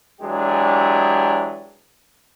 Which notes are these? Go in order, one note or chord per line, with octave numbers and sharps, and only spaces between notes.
E3 F#3 G#3 D4 G4